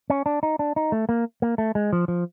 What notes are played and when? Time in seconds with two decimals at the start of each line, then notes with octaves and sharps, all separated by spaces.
0.10 C#4
0.26 D4
0.43 D#4
0.59 D4
0.76 D#4
0.92 A3
1.09 A#3
1.42 A#3
1.58 A3
1.75 G#3
1.93 F3
2.08 F3